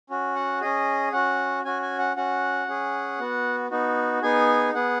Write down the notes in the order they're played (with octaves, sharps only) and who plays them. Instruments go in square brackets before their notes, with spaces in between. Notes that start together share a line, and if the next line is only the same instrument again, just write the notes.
[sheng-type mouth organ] C#4 F#4
F#5
C#4 G#4 D#5
C#4 F#4 F#5
C#4 F#4 G#5
G#5
F#5
C#4 F#4 F#5
C#4 G#4
B3 F#4
B3 D#4 F#4
B3 D#4 G#4 G#5
B3 G#4 F#5